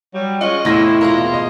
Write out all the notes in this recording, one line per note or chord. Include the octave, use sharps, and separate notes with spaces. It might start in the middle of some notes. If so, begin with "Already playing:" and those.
F#3 G3
G#3 C#4 F4 D#5 F#5
E2 A2 C3 E4 F5 A#6
B2 G#3 F4 A#4
D#5